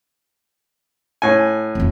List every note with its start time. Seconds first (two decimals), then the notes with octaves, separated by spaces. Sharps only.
1.22 A2 G#5
1.75 F1 F2